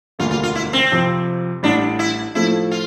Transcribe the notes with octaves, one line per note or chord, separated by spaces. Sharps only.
E1 D2 D3 G3 A#3 F4
F4
F4
E4
C4
F2 C3 F3
A1 A2 G3 D4
E4
A2 F3 A3 E4
F4